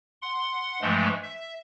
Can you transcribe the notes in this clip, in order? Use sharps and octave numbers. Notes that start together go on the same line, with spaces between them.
F#5 C6
G2 E3 F3 G#3 A3
E5